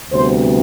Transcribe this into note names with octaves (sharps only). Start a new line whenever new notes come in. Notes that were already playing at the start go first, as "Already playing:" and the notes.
D2 C3 G3 B3 C5